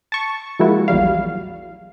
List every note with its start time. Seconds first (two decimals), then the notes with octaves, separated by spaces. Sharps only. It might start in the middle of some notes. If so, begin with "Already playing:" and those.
0.12 A5 C#6
0.59 F3 F#3 G#3 A#3 E4 F#4
0.88 A#1 E2 F#3 G3 F5